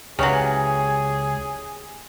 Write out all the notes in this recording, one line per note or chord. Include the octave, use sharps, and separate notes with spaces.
C#2 C#3 E3 F#3 G4 G#4 C#5